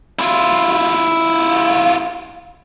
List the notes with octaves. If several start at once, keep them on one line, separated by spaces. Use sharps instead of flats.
E4 F4